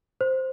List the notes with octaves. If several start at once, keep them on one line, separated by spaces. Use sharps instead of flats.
C5